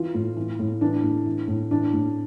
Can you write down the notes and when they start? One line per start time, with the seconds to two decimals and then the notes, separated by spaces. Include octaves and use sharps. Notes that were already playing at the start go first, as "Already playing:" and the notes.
Already playing: E3 F4
0.14 A2
0.36 E3
0.59 A2
0.81 E3 D4
1.03 A2
1.26 E3
1.48 A2
1.71 E3 D4
1.93 A2